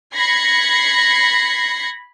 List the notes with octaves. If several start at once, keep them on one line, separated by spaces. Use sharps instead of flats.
B5 G#6 A#6 C7 C#7